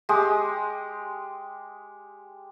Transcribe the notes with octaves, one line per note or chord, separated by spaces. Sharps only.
G#3 G4 D#6